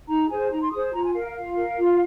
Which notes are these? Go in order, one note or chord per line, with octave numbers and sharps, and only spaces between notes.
D#4 A#5
G#4 C5 G#5
D#4 A#5
C6
G#4 C5 D#6
F4 A#5
G#5
A#4 F5
F5
F4 F5
A#4
F4